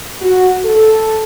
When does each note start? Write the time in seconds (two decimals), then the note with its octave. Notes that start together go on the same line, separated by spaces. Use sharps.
0.22 F#4
0.64 A4